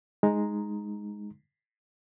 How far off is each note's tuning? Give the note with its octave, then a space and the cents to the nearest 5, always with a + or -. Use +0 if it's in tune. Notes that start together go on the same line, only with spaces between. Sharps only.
G#3 +0 D#4 +0 A#5 +0